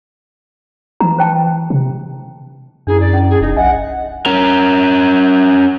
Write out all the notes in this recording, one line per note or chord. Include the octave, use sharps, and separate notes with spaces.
E3 A#5
C5 G5 A5
C3
F#2 D4 E4 G#4
D5
C#4
G#4
F1 D#4
B1 D#5 E5 F#5 G#5
C#4 A#4